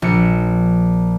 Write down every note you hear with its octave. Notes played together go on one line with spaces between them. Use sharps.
A#1 C#7